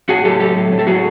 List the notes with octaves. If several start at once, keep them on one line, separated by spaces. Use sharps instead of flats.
A2 F#4 G#4
F#3 G4 A4
F#3 G4 A4
A2
A2
A4
F#3 F#4 G#4